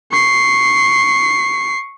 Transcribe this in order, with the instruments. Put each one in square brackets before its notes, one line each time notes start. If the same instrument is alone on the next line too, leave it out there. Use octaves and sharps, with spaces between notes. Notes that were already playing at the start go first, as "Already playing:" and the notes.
[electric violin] C#6 C7